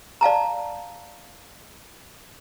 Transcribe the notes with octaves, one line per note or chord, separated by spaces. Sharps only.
D5 F5 A5 A#5